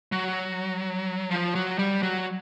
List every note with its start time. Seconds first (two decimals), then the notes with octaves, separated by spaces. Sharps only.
0.12 F#3
1.30 F3
1.55 F#3
1.79 G3
2.03 F#3